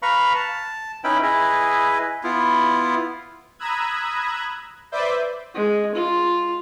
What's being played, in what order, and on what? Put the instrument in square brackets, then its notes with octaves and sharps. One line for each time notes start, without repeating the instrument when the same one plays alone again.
[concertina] B4 F5 A#5 B5 C#6
A5
C#4 D#4 E4 B4 G5 B5
E4 G#4 B4 D#5
[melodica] B3 E4 F4
[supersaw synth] A#5 B5 D#6 E6 F#6 G#6
B4 C5 D5 E5 D6 G6
[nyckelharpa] G#3
F4